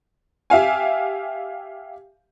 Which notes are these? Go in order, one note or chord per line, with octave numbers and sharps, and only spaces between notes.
G4 E5 F5 G#5